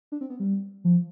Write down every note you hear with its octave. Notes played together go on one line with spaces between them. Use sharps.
D4
C4
B3
G3
F3